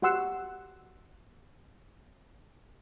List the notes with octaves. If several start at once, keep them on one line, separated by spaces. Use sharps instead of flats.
F#4 G4 F#5 C6 E6